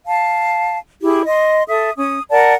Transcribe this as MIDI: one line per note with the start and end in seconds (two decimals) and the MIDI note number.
0.05 0.77 77
0.05 0.77 81
1.01 1.21 64
1.01 1.21 67
1.01 1.21 68
1.25 1.62 75
1.25 1.62 84
1.67 1.91 69
1.67 1.91 76
1.67 1.91 87
1.96 2.20 61
1.96 2.20 87
2.30 2.54 70
2.30 2.54 74
2.30 2.54 78
2.30 2.54 81